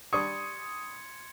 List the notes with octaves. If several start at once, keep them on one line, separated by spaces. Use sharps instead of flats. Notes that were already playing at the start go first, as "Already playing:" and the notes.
G3 D4 C6 C#6 D#6 G#6 C#7